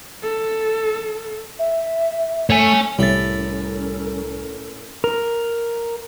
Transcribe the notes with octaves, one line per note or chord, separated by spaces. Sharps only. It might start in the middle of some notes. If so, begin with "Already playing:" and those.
A4
E5
A3 C#5 G#5
C2 A2 G3 C#4 A4 A#4 E5 A6
A#4